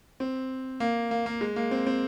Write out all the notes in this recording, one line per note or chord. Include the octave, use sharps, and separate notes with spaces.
C4
A#3
A#3
A#3
G#3
A#3
C4
C4